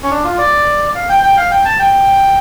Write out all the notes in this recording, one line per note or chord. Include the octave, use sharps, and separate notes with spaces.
C#4
D4
F4
D5
F5
G5
G5
F5
G5
A5
G5